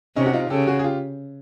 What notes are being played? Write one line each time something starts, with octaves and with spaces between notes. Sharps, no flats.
C3 C#4 D#4
F#4
D#4 F4
C#3 G4 A4
F#4 G#4
G#4
F4 G4